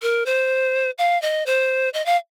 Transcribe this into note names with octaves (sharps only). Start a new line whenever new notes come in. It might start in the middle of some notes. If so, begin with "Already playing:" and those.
A#4
C5
F5
D#5
C5
D#5
F5